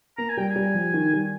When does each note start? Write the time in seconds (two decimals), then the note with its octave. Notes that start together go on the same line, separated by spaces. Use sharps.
0.18 A#3 A#5
0.29 G#5
0.37 G3 G5
0.49 G#5
0.56 G3
0.74 F3
0.94 D#3
1.13 G3